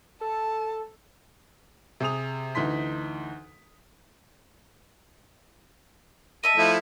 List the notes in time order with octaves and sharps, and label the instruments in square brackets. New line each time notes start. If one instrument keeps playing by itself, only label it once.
[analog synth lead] A4 [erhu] A5
[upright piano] C3 G#4 D#6 F7
D2 E3 D#4 C6 B6
[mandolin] D#5 E5 A5 [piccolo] D#7
[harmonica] F3 A3 E4